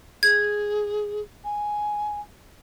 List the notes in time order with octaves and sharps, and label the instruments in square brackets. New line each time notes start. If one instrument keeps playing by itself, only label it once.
[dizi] G#4 [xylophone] G#6
[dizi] G#5